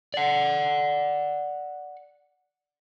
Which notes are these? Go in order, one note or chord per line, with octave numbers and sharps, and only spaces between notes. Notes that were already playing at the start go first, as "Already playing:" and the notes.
D5 F#5